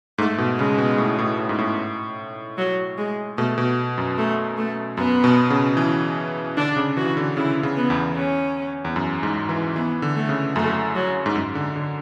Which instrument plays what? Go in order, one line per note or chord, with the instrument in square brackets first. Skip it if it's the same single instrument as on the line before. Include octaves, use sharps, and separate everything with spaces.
[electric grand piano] G#2 [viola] A3
[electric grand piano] B2
[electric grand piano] C#3 [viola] G#3
[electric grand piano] B2
A2
A2
A2
G#2
A2
[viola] F#3
G#3
[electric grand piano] B2 [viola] A3
[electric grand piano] B2
F#2
[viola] A3
A3
[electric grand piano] F#2 [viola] B3
[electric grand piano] B2
C#3
E3
[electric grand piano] D3 [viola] D4
[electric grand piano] C#3
[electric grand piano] E3 [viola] F#4
[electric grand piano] D3
[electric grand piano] C#3 [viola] E4
[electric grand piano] C#3
[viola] B3
[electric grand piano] E2
[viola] C#4
[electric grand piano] E2
F#2
G#2
E3
[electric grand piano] E3 [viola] B3
[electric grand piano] D3
[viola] A3
[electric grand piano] C#3
[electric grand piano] F#2 [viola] A3
[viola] F#3
[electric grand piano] G#2
F#2
D3
D3